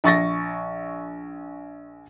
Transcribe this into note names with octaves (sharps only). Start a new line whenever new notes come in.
A#1 C#6 A6 A#6